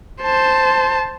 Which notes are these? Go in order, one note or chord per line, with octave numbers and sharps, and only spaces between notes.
C5 A5